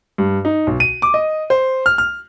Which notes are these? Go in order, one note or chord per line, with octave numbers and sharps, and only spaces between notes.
G2
D#4
B1
D#7
D6
D#5
C5
F6
F6